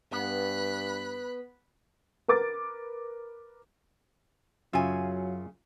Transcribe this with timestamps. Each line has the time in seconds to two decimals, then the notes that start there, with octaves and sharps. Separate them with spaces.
0.12 G2 B3 B5 F#6
2.28 A#4 B4 D6 A6
4.73 F#2 C#3 F#3 F4 E5 G#5